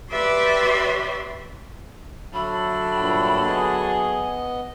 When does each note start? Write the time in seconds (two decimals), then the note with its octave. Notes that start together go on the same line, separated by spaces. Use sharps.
0.11 G4 B4 D5 E5 C6 D6
2.34 D3 F#3 A4 E5 B5
2.96 G2 A#2 G5
3.46 B3 G#4 D#5